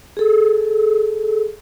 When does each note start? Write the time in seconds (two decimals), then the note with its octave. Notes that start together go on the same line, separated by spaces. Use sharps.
0.17 G#4 A4